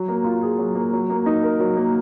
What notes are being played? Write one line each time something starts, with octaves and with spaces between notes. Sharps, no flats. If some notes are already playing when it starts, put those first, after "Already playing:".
Already playing: F#3
A#3
F4
G#4
F#3
A#3
F#3
A#3
D#4
A#4
F#3
A#3